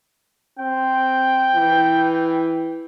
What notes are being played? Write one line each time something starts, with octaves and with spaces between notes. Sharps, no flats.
C4 G5
E3